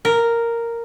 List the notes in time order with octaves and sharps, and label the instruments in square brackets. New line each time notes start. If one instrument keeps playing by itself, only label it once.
[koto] A#4